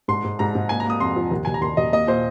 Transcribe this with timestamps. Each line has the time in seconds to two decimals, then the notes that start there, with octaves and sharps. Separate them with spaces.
0.08 G#2 C6
0.24 G#2
0.39 G#2 A#5
0.55 G#2
0.69 A#3 G#5
0.80 A#5
0.86 A#3 D#6
1.00 F2 C6
1.16 F3
1.31 D#2
1.45 D#2 G#5
1.54 A#5
1.61 D#2 C6
1.77 D#2 D#5
1.92 A#3 D#5
2.07 A#2 C5